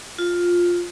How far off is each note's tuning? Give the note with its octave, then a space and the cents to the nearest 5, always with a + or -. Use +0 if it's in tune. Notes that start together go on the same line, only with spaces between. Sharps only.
F4 +10